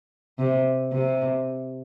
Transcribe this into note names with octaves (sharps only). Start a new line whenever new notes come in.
C3
C3